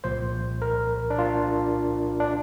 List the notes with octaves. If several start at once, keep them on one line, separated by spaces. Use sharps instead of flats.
C2 A#2 F3 C5
A#4
D4
F4
D4